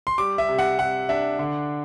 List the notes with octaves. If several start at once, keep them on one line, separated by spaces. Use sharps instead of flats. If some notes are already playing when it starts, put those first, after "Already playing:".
C6
G3 D6
E5
C3
F#5
C3 F#5
D4 E5
D3